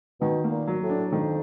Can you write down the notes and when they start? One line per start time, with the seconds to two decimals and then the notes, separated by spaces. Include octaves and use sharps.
0.21 B2 D#3
0.44 A#3
0.51 A#2
0.67 F#3
0.83 A2
0.90 D4
1.12 F2 D#3